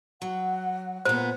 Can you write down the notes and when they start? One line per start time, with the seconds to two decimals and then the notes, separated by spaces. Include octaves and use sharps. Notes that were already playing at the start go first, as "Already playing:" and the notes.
0.22 F#3 F#5
1.05 A#2 B3 C5